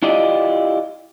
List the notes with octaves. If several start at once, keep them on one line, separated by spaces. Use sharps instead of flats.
E4 F4 G4 D5 D#5